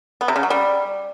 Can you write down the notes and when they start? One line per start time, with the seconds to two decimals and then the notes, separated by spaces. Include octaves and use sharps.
0.21 B3
0.28 C3
0.36 C#3
0.43 F#3
0.50 G3